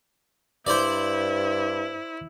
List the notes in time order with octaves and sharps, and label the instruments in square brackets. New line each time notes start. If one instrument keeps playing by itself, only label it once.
[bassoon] G2 [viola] E4 [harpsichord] C5 D5